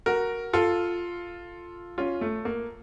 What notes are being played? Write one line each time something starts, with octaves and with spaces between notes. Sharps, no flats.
F#4 A#4
F4 A4
C#4 F4
A3
A#3